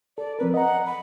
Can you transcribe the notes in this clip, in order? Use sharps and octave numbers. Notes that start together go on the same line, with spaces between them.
A4 D5
F3 C4 A#4 B4
D#5 F#5 A#5
B5